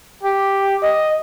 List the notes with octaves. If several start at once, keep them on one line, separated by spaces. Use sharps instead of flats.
G4
D#5